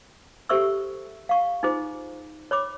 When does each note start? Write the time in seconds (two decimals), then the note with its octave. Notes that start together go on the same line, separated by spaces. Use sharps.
0.49 G4 A4 C5 E5 C#6 E6
1.29 F5 C#6
1.63 D#4 F4 G#4 C5
2.51 C#5 B5 D6